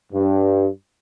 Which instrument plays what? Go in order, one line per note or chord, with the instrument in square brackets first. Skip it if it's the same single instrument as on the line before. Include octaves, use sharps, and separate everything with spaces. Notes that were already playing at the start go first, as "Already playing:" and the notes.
[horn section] G2